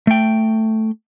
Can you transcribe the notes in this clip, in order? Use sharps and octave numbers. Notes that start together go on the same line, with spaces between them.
A3 G5